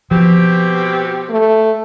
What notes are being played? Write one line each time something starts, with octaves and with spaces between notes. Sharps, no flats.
B2 F3 C4 G4
A3